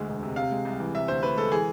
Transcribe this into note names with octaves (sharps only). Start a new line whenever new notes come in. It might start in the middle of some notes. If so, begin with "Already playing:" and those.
Already playing: D2 G#3
E1
C3
C3 F5
G#3
C2
E3
C3 E5
D2 C5
D2 B4
G#3 A4
E3 G#4